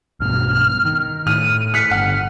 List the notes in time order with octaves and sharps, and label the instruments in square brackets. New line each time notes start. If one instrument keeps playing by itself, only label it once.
[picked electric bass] B1 G2 B2 [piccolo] F6
[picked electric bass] D#3
[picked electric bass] A2 [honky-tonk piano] F6 [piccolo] D#7
[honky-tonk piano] F6 F#6 B6 [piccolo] C#7
[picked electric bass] G1 D3 [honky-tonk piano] F#5 [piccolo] F6